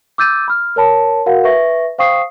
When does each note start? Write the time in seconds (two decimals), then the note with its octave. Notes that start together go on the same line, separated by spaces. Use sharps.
0.18 D6 E6 G6 A6 D#7
0.48 B5 F6
0.76 A#4 C#5 A5 B5
1.26 F#4 A#4 F5 F#5
1.44 B4 E5 C#6 A#6
1.98 C5 F5 G5 C#6 D#6 C7